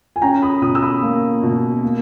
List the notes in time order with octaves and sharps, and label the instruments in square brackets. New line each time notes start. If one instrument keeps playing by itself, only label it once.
[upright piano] G#5
C#4 G5 A#5
B5 D#6
B2 B5 D#6
E6
B5 D#6
A#3
B2
A#3